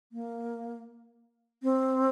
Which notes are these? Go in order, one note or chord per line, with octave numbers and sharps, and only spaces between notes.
A#3
C4